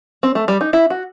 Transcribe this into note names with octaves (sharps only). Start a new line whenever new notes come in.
C4
A3
G3
D#4
E4
F#4